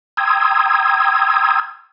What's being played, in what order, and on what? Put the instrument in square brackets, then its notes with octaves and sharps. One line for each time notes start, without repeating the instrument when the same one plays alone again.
[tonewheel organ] G5 A#5 C6 D#6 E6 G#6